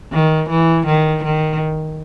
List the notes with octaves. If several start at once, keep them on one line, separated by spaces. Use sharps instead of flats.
D#3
E3
D#3
D#3